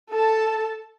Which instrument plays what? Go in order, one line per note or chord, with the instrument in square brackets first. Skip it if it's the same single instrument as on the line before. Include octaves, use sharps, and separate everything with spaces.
[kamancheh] A4 A5